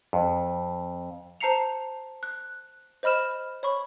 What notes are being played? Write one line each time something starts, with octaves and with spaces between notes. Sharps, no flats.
F2
C5 A5 A#5 C7 C#7 F7
F#6
C5 D#5 B5 F6 E7
C#5 B5 C#6